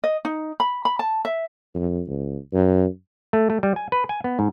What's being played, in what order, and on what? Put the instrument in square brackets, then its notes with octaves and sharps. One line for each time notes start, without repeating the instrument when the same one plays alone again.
[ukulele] D#5
D#4
B5
B5
A5
E5
[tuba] F2
C#2
F#2
[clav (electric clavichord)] A3
A3
G3
G#5
B4
G#5
B3
G#2